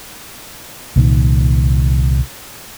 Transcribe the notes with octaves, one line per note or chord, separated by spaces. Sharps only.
C2 A#2 D#3